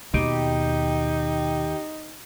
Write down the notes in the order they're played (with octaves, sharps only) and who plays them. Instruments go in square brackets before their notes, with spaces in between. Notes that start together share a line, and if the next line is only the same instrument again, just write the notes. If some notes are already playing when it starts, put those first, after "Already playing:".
[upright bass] D#2 [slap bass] B2 [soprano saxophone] D#4 [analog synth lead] G4